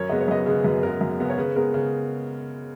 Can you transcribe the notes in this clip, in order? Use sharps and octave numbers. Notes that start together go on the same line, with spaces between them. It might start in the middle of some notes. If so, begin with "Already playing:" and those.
Already playing: F#2 A#4 C#5
C#3 G#3 B3 D#5
C#5
F#2 B4 D#5
C#3 G#3 B3
F#2 B4
C#3 G#3 B3 A#4
F#2
C#3 G#3 B3
C#5
C#3 B4
G#3 B3 A#4
C#3